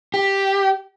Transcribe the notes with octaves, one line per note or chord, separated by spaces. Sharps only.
G4